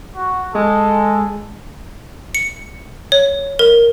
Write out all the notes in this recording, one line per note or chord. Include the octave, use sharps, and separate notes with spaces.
F#4
G#3 A4
C#7
C#5
A#4